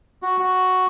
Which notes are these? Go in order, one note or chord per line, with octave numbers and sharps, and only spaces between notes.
F#4
F#4